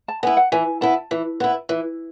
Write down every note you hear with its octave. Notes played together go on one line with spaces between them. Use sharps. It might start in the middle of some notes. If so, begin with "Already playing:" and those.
A5
B3 E4 G#5
F#5
E3 G#5
B3 E4 A5
E3
B3 E4
E3